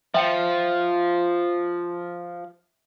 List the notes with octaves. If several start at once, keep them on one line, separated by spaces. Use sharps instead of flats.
F3 E5 G5 C#7